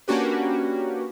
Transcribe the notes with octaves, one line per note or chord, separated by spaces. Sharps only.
A#3 C#4 D4 F#4 G4 B4